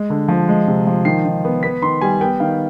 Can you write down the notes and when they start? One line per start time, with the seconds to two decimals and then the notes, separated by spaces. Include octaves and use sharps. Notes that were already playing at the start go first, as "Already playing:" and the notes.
Already playing: G#3
0.10 D3
0.28 F3
0.49 G#3
0.67 C3
0.87 F3
1.05 D#3 C7
1.26 D#3
1.45 B3
1.63 B3 B6
1.82 D#3 C6
2.01 G3 G#5
2.21 B3 G5
2.40 D#3 F5